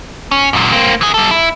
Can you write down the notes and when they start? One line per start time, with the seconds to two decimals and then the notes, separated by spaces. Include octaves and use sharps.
0.31 C#4
0.53 F#2 A#2
0.72 A#3 C4
1.01 E3 G#4
1.14 G3 A4
1.31 E4